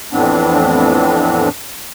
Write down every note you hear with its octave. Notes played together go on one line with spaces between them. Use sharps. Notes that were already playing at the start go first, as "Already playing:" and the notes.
F2 A2 E3 B3 C4 D4